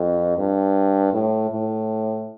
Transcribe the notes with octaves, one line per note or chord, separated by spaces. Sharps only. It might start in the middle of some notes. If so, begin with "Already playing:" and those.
Already playing: F2
G2
A2
A2